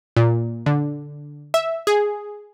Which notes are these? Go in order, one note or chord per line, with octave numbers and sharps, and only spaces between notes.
A#2
D3
E5
G#4